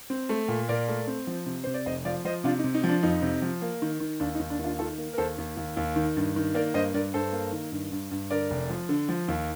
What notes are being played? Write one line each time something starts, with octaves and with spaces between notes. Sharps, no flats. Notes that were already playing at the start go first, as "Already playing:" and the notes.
C4
A3
A#2
A#2 A#4 D5
A3
C4
F3
C3
C3 C5
D5
F1 C5 D#5
F3 D5 F5
F3 C5 D#5
C3 D4 F4
D#4
C3
D#4
F3
D4
F2 D#4
C3
F3
A#3
D#3
D#3
D#2 D4
D#4
D#2
D4
D#2
D4 F4
D#3 F4 A4
A#3
A#4
D#2 A4 C5
D#2
D#2
D#2
D#3
G2
D#3
A#3 A#4 D5
G2 C5 D#5
G2 A#4 D5
G2 A4 C5
A#3
D#3
G2
G2
G2
D3 A#4 D5
F1
F3
D3
F3
D#2